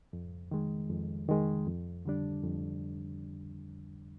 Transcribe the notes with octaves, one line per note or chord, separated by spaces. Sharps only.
F2
D#3 G#3
F2
D#3 G#3
F2
D3 G3 D4
F2